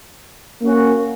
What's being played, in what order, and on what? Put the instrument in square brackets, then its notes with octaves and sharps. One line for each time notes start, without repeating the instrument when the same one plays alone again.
[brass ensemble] A#3 C#4 F#4